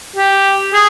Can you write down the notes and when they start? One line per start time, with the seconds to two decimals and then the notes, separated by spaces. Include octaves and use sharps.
0.16 G4
0.73 G#4